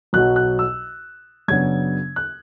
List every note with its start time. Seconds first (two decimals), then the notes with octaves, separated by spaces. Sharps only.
0.13 B1 B2 F#3 F#6
0.36 F#6
0.59 E6
1.48 F#2 C#3 F#3 B3 D4 G#6
2.16 F#6